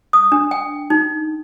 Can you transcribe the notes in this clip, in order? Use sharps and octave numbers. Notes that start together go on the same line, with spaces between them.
D#6
D4
G5
D#4